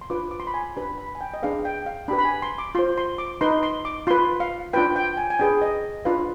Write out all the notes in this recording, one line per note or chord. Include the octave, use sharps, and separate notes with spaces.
C6
D4 F4 B4 D6
D6
C6
B5
G#5
D4 G4 B4 B5
B5
G#5
G5
D#5
D4 G#4 B4 F5
G5
F5
D4 G4 B4 B5
B5
G#5
C6
D6
F4 C5 C6
C6
D6
D#4 B4 C6
C6
D6
F4 B4 C6
F5
D4 F4 B4 G5
G5
G#5
G#5
D4 G#4 B4 G5
D#5
D4 F4 B4 F5